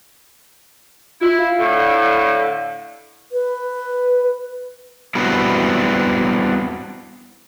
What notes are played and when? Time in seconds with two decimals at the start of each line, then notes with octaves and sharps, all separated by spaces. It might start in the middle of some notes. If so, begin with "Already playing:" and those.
1.21 E4 F4
1.39 F5
1.59 A2 D3
3.32 B4
5.15 G3 B3 C4 D4 E4 F#4